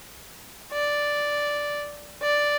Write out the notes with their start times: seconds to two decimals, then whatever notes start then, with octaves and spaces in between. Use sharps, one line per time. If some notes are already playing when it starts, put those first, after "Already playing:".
0.73 D5
2.22 D5